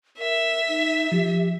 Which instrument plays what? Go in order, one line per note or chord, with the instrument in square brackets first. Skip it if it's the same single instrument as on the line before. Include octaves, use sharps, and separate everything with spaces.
[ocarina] A#4 [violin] E5
[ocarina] D#4
[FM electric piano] F3 [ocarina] G4